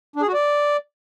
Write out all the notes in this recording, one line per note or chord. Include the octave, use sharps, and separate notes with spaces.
D4
G#4
F#4
D5